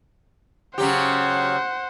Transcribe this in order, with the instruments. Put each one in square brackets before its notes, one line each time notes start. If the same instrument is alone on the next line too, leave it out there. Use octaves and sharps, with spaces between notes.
[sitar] C#3 F#3 G4 [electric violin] C5 F#5